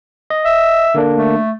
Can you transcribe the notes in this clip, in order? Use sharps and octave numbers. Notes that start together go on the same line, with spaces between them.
D#5
E5
D3 A#3 D4
A3